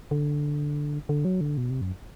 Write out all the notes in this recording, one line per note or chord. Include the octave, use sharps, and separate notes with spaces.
D3
D3
F#3
D3
B2
C3
F#2